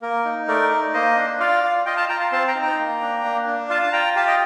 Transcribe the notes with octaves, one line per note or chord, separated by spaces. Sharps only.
A#3 A#4
D#4
A3 A#4 D5
D#4
A#3 C5 D#5
D4
F4 D5 F5
F4
F4 D#5 G5
F5 A5
F4 G5 A#5
A5 C6
C4 A5 C6
G5 A#5
D#4
G5 A#5
A#3
D4
A#3
D4
F4 F5 A5
A5
F4 G5 A#5
G4 F5 A5
D#5 G5